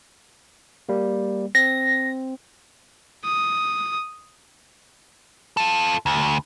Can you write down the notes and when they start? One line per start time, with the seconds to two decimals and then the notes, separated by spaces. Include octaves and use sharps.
0.89 G3 A#3
1.55 C4 A#6
3.25 D#6
5.57 F4 A4
6.06 D2